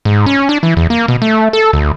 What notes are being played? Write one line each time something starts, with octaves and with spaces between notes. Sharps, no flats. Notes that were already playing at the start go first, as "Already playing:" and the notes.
G#2
C#4
D4
E3
E2
A#3
B2
A3
A4
D2